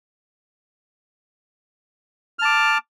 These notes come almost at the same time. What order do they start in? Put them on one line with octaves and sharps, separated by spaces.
F6 A5 D6